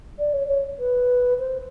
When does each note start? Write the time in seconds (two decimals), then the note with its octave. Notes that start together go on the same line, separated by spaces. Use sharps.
0.19 D5
0.33 C#5
0.48 C#5
0.79 B4
1.39 C5